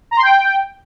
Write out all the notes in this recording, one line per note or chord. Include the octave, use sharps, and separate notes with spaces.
A#5
C6
G5